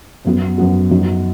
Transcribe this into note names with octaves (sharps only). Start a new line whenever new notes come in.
F#2 F#3 B3 F#4
F#2 F#3 B3 F#4
F#2 F#3 B3 D#4 F#4